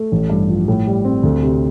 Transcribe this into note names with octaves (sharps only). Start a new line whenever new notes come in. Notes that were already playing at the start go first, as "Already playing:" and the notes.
Already playing: A3
A1
G2
F3
A2
G3
C4
D2
C3